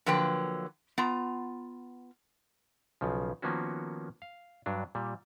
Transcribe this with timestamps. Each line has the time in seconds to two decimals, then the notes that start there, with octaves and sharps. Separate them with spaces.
0.06 D3 F3 F#3 A#3 B4 G5
0.98 B3 F4 A#5
3.01 B1 C#3 F3
3.42 D#3 F3 A#3 B3 C#4 F#4
4.22 F5
4.66 G2 F#3 D4
4.95 A#2 G3